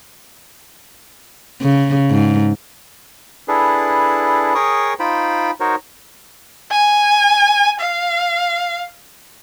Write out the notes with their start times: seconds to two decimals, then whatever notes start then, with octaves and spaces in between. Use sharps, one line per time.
1.62 C#3
2.11 G#2
3.48 D4 E4 G#4 A4 B4
4.55 G#4 A#4 C#5 G5 C#6 D#6
4.99 D#4 F4 C5 G5 B5
5.60 D#4 F#4 A#4 C5 C#5
6.71 G#5
7.80 F5